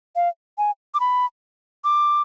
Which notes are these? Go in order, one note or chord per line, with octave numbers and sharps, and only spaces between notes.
F5
G#5
D6
B5
D6